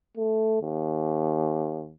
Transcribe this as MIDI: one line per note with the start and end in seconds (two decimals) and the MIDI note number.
0.17 0.61 57
0.62 1.93 39